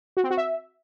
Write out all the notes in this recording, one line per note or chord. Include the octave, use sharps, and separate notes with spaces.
F#4
C4
F#4
E5